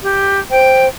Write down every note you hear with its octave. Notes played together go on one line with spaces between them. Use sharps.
G4
C5 G5